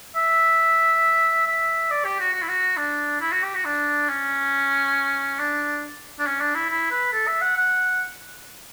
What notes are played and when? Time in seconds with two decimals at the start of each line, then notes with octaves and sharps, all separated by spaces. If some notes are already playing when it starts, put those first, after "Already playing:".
0.16 E5
1.47 E5
1.91 D5
2.05 G4
2.20 F#4
2.33 F#4
2.42 E4
2.49 F#4
2.77 D4
3.21 E4
3.32 F#4
3.42 G4
3.54 F#4
3.65 D4
4.09 C#4
5.39 D4
6.19 D4
6.27 C#4
6.40 D4
6.55 E4
6.69 E4
6.91 B4
7.13 A4
7.27 E5
7.42 F#5
7.57 F#5